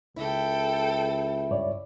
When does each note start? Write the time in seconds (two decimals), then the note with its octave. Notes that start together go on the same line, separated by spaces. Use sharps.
0.16 C#2 E4 A4 G5
1.51 G2 C#5 D5